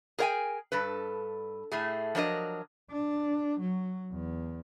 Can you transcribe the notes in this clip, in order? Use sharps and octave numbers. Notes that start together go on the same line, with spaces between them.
G#4 A#4 C#5 F5 G5 G#5
G2 A4 B4
A2 A3 G#4
F3 F#3 D4 A#4 D#5
D4
F#3
E2